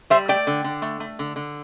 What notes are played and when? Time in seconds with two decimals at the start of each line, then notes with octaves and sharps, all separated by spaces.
0.10 G3 C5 E5
0.28 A3 D5 G5
0.47 D3
0.64 D3
0.82 A3
1.00 A3
1.19 D3
1.36 D3